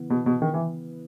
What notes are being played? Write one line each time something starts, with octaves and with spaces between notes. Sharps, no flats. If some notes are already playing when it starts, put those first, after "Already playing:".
Already playing: C#3 E3 B3 E4 B4
B2
B2
D#3
E3